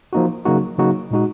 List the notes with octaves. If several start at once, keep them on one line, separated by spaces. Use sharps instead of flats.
F3 A#3 D#4 F#4
C#3 F#3 A#3 D#4 F#4
C#3 F#3 A#3 D#4 F#4
A#2 G#3 D#4 F#4